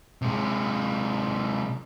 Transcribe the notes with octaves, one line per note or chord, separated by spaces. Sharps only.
C3 G#3